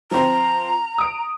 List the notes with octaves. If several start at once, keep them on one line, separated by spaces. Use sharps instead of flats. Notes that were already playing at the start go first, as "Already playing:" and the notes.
F3 C4 A#5
D#6 D7